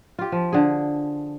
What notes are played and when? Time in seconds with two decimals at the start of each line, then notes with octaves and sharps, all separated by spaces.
0.19 F4 G4
0.32 F3
0.53 D3 G#4